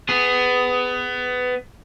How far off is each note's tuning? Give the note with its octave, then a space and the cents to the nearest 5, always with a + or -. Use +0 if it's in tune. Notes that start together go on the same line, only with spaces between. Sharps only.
B3 +20 G#4 +0